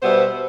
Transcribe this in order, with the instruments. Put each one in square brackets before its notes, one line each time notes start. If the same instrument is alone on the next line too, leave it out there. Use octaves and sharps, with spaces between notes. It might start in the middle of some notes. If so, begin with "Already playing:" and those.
[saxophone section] B2 G3 B3 C5 E5